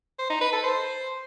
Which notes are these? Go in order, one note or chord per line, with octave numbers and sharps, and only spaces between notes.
C5
D#4
B4
A4
C5